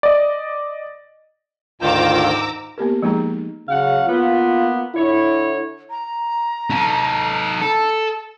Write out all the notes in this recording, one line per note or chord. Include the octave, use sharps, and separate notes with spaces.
D5 D#5
D2 G#2 D#3 F4 A#5 D6 E6 G6
A#3 B3 G4 A#4
F3 G#3 A#3 D#4 G#4 A#5
C#3 F#3 F5 F#5
A#3 B3 F4
D3 E4 C#5
A#5
D#4 A4
A4